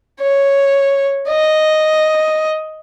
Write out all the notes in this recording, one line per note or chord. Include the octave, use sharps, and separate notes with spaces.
C#5
D#5